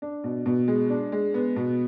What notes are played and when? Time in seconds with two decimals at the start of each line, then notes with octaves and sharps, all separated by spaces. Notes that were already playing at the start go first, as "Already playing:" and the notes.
0.02 D4
0.24 B2
0.46 B2
0.68 G#3
0.90 D4
1.12 G#3
1.34 B3
1.56 B2